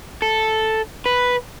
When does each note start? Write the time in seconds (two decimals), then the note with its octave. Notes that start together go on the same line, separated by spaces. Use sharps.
0.22 A4
1.06 B4